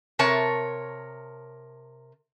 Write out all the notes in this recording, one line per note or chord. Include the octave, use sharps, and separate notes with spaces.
C3 A#4 C#5 A5